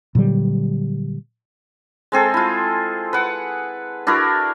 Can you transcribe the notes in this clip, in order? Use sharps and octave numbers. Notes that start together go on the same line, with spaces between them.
A#2 D3 F#3 G3
G#3 C4 G#4 A4
E4 F4
B4 F#5
D4 E4 F#4 A#4